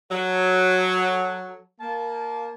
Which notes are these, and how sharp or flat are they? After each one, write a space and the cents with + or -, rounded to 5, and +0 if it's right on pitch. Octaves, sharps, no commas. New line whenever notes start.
F#3 -5 A4 +0
A#3 +0 A5 -25